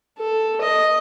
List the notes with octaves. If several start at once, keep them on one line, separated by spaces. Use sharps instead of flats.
A4
D#5